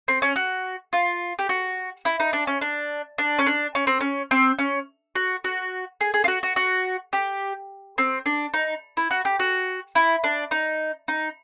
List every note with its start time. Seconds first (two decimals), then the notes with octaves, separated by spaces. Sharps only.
0.08 C4
0.22 C#4
0.36 F#4
0.93 F4
1.39 G4
1.49 F#4
2.05 E4
2.20 D#4
2.33 D4
2.47 C#4
2.61 D4
3.18 D4
3.39 C#4
3.46 D4
3.75 C#4
3.87 C4
4.01 C#4
4.31 C4
4.59 C#4
5.15 F#4
5.44 F#4
6.01 G#4
6.14 G#4
6.24 F4
6.28 F#4
6.43 F#4
6.56 F#4
7.13 G4
7.98 C4
8.26 D4
8.54 D#4
8.97 E4
9.11 F#4
9.25 G4
9.39 F#4
9.95 E4
10.24 D4
10.51 D#4
11.08 D#4